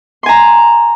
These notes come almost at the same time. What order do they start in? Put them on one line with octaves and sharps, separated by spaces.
C6 G#5 A#5